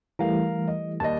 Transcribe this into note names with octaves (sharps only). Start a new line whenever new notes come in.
E3 G3 A3 A#4 F5
D#5
D#2 G3 D#5 A5